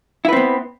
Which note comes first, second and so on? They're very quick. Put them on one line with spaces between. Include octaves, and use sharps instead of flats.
E4 B4 C4 B3